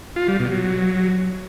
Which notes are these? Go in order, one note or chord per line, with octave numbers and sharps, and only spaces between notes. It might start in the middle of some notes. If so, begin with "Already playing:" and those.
F4
G3
B2
F#3